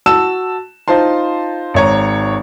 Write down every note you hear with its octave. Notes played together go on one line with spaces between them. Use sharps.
F#4 A5 E6 E7
D#4 F4 C5 A5 C6
G#1 C#5 A#5